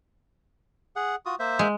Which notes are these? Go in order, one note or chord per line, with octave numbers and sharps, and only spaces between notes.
G#4 F#5
F4 F#4 D#6
A#3 C5 E5
G#3